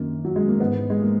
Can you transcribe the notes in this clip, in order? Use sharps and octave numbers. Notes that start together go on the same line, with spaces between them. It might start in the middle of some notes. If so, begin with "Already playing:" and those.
Already playing: F#2 D#3 A#3
F#3
G#3
A#3
G#2 E3 B3
G#3
A#3